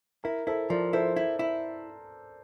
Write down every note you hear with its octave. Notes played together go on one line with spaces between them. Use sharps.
E4 A#4
E4 A4 C5
F3 A#4 D5
E4 A4 C5
E4
E4